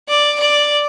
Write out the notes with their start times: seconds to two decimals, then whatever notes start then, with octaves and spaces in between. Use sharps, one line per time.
0.09 D5
0.40 D5